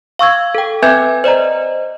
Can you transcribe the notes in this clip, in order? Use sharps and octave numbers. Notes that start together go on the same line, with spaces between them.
F5 C#6 E6 G#6
A4 G5
C4 B4 E5 G#5 G6 G#6
C5 D5 D#5 A#5